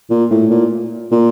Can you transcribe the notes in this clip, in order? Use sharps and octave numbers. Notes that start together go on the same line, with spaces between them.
A#2
A2
A#2
A#2